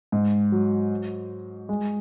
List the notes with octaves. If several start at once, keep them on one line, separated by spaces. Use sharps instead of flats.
G#2
F#3
G#3